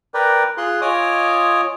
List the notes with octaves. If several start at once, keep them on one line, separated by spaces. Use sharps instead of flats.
A#4 B4 D5 G5
F4 G#4 C6 F#6
F4 C#5 D#5 G#5 D6 D#6